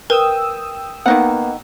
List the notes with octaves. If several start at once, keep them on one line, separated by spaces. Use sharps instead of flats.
A#4 B4 G5 D#6 E6
D#3 A#3 B3 D#4 F#5